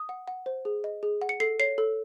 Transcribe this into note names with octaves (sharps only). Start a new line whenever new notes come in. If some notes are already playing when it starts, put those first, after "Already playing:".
Already playing: D#6
F#5
F#5
C5
G#4
D#5
G#4
F#5
C#7
A4 C7
C#5 C7
A4